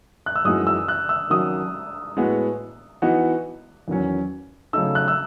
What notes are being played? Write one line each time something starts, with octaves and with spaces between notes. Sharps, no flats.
F#6
E6
F#2 E3 G#3 D#4 F#4 D#6
E6
F#6
E6
D#3 F#3 C#4 F#4 D#6
A2 G#3 B3 F#4
E3 B3 D#4 F#4
E2 D#3 F#3 C#4
C#3 F#3 A3 D#4 E6
F#6
E6